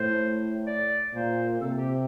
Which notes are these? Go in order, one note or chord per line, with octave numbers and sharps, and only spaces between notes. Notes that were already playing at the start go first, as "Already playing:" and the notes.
Already playing: A2 C5
D5
A#2 C5
C3 A4
G4